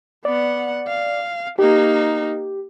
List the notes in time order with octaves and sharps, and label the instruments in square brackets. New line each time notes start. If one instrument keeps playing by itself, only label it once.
[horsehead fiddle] B3 F#5 [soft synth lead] D5
[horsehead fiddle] F5
[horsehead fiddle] A#3 D#4 [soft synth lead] G4